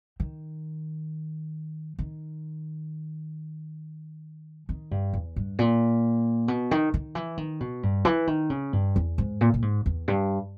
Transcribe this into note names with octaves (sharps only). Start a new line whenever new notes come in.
D#3
D#3
D#3
G2
E2
G2
A#2
B2
D#3
D#3
E3
D#3
B2
G2
E3
D#3
C#3
G2
E2
G#2
A#2
A#2
G#2
E2
G2